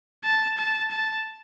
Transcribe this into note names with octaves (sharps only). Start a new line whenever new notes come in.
A5
A5
A5